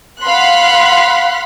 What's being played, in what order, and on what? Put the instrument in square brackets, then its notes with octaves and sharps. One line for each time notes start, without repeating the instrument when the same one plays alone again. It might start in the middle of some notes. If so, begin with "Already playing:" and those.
[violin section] F5 F#5 B5 C6 F#6